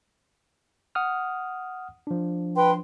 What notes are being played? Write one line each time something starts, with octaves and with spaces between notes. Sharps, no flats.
F#5 D#6 F6
F3 D4
B4 G5 C6